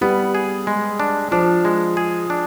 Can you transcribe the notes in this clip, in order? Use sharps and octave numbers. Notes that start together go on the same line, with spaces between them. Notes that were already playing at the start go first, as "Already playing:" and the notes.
G3 B3
G#4
G#3
D4
F3 D4
G#3
G#4
D4